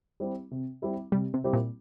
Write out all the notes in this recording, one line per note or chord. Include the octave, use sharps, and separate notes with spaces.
G3 C4 E4 G4
C3
G3 C4 E4 G4
C3 G3
C3
G3 C4 E4 G4
A#2